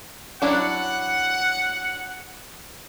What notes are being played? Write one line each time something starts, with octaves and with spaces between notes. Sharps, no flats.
F#3 D4 E4 F#5